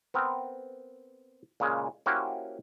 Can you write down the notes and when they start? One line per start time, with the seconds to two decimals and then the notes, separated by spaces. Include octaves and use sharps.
0.14 B3 C4 A#4
1.60 A#2 C#3 G#3
2.06 A#3 C#4 E4 F#4 G4 C5